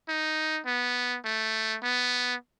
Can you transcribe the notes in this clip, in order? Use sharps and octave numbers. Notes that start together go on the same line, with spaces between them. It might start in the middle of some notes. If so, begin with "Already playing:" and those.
D#4
B3
A3
B3